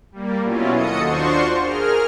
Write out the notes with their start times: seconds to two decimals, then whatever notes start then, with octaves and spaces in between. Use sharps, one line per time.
0.12 G3 A#3
0.43 B2 F#3 C#4 E4 F4
0.73 D#2 F#4 A4 D#5 D#6 C#7
1.02 D4 F4 F#4 C5 C6 C#6
1.60 G#4 A#4 F6